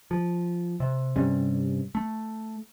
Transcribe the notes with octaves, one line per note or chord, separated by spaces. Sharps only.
F3
C3
G2 C3 G3 C#4
A3